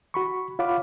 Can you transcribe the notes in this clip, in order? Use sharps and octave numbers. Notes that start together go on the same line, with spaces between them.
F#4 B5 C#6
F4 C#5 F5 F#5 B5 D6